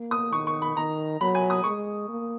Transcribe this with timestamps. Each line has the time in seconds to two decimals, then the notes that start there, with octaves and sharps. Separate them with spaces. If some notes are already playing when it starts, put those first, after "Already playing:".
Already playing: A#3
0.11 D#6
0.33 D#3 C#6
0.47 C#6
0.62 B5
0.76 D#3 A#5
1.21 F#3 B5
1.35 G#5
1.50 D#6
1.64 G#3 C#6
2.09 A#3